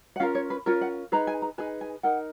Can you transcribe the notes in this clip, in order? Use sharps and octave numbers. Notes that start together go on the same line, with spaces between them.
F#5
C#4 F4 A#4 F5
C#5
B4
C#4 F4 A#4 C#5
F#5
D#4 G#4 B4 A#5
G#5
A#5
D#4 G#4 B4 G#5
G#5
D#4 A#4 F#5